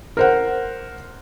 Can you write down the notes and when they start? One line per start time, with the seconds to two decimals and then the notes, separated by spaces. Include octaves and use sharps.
0.17 A#4 C5 F#5